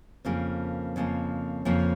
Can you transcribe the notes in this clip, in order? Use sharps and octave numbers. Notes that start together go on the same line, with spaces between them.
F2 C#3 F3 A#3
F2 C#3 F3 A#3
F2 C#3 F3 A#3